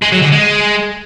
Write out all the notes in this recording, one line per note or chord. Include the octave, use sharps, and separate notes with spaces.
G#3
F#3
D3
G#3